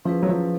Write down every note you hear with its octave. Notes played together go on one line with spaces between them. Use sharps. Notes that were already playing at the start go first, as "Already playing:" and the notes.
F3 C#4 E4 G#4 B4
F#3
F3